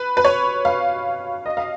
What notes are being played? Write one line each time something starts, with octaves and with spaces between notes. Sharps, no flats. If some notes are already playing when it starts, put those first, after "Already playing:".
Already playing: B4
B4
C#5
F5
D#5
F5